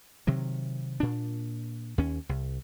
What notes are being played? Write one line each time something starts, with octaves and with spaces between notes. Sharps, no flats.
C3 D#3 F#3
A#2 D4
D#2 C#4
C2